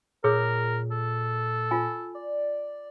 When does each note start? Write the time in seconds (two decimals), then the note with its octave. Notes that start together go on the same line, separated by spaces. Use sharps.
0.24 A#2 G#4 A#4 C#5 E6
0.91 A4
1.71 F4 G#5
2.15 D5